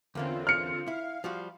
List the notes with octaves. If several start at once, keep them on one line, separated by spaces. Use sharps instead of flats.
E2 D3 A#3 C4 C#4 F4
F6 C#7
E4 F5
F3 G3 F#4